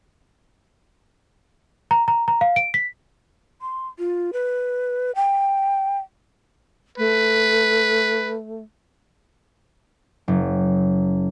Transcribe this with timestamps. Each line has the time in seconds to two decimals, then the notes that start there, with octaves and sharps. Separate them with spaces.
1.91 A#5
2.08 A#5
2.28 A#5
2.41 F5
2.56 D7
2.74 B6
3.62 C6
3.99 F4
4.33 B4
5.16 G5
6.98 A3 B4
10.28 F#1